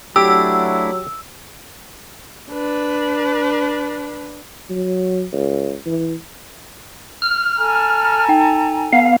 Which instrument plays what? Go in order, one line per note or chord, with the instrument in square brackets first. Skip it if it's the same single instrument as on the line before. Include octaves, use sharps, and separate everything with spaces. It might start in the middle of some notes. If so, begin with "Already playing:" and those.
[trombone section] F#3 [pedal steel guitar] A3 D4 E4 [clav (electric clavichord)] G4 [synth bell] E6
[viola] D4 B4
[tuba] F#3
C#2
E3
[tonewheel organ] F6
[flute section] A4 G#5 A#5
[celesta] D#4 G5
[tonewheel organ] B3 F5